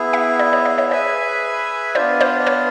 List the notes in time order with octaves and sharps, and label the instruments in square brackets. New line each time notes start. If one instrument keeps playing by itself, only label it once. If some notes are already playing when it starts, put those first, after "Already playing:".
Already playing: [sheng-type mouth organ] B3 E4 G#4
[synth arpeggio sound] E5 F#5
D5 E5
C#5 D#5
D5 E5
C#5 D#5
[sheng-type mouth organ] G#4 B4 E5 G#5 [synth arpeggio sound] C5 D5
[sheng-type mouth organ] B3 D4 F4 [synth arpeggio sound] C5 D5
[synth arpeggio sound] C5 D5
B4 C#5